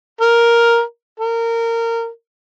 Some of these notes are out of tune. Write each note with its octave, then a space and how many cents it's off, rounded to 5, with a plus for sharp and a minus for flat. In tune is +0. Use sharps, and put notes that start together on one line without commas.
A#4 +5
A#4 -20